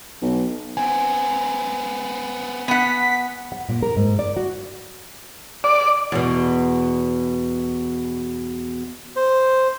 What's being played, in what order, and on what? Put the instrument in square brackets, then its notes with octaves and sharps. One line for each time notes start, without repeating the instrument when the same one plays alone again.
[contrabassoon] B1
[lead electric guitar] B3 C4 [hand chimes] G#5
[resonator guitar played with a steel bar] B3 F#5 [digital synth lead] B6
[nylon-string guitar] F#5
A#2
A#4
G#2
D5
F#4
[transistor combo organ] D5
[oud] E2 B2
[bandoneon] C5